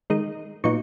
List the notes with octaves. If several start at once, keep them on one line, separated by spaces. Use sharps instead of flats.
D#3 G#3 D#4 D#6
A#2 F#3 B3 D#4 C#6